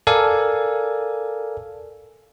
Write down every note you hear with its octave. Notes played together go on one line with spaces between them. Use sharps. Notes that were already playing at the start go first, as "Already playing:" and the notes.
A4 A#4 D5 F5 G#5